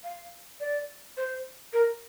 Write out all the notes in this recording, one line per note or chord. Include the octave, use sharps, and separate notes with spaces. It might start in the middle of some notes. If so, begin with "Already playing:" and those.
F5
D5
C5
A#4